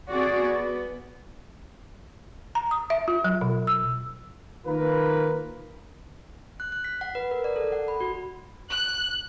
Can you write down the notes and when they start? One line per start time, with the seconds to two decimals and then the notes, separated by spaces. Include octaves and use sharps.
0.11 C4 F#4 G#4 D5
0.41 B3
2.55 A#5
2.71 D#6
2.90 E5
3.08 F4
3.24 F#3
3.41 B2
3.67 E6
4.67 D#3 A#3 F4 A#4 B4
6.60 F#6
6.72 F#6
6.84 B6
7.01 F#5
7.15 B4
7.31 A#4
7.44 D5
7.56 A4
7.72 F#5
7.88 B5
8.00 F#4
8.70 F#6